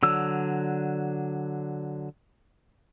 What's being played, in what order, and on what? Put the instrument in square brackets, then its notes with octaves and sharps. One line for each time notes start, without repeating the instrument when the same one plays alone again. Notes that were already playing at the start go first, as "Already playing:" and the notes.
[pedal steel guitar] D3 F#3 E6